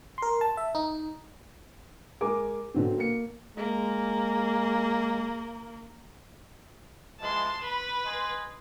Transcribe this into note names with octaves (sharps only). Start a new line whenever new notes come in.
A#4 C6
A5
E5
D#4
G#3 A#4 G#5 D6
B2 D3 F#3 C4
A#3 C#7
G#3 A#3
E3 F3 G#3 A5 C6
B4 B5
D#5 G#5 C6